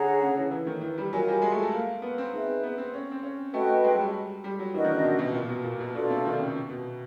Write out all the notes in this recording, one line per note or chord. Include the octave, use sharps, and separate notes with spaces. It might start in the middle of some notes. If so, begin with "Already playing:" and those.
Already playing: D3 G#4 C#5 F#5 A#5
C#3
E3
E3
D#3
E3
G3
F#3 F4 A#4 D#5 G#5
G3
G#3
A3
A3
A#3
B3
C4
D#4 G#4 B4 E5
B3
C4
C#4
C4
C#4
A3 F#4 B4 D#5 G5
G#3
F#3
G3
G3
F#3
E3 D4 F#4 A#4 D#5
D#3
C#3
C3
B2
A#2
B2
A#2
B2
B2 D4 F4 A4 D5
C3
D#3
C#3
B2